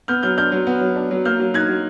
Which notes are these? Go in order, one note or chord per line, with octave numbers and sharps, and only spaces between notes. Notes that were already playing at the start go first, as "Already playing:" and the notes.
B3 F6 G6
F#3 F6 G6
D4 F6 G6
F#3
B3
F#3
D4
F#3
A#3 F6 G6
F#3
D#4 F#6 G#6
F#3